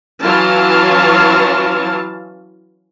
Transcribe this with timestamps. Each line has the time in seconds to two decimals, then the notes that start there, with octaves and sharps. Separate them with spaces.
0.22 E3 F#3 C#4 F4 F5 A5